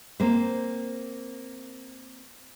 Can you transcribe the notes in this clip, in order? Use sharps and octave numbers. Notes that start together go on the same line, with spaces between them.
A#3 C4 C5